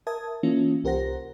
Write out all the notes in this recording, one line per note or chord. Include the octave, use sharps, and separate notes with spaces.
A#4 E5 A5 D#6 G#6
E3 A#3 C#4 F4
C2 G4 A#4 C5 F#5 A#6